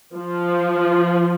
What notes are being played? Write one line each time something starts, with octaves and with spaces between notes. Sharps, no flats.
F3